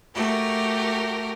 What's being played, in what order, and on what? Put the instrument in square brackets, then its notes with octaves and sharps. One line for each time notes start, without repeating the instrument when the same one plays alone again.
[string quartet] A3 F#4 G4 A#4